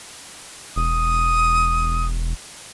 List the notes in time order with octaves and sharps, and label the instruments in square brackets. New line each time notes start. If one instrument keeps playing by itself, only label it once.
[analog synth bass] E1 [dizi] D#6